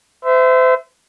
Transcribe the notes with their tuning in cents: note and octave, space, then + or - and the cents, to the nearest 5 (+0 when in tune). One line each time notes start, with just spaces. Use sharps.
C5 -35 E5 +0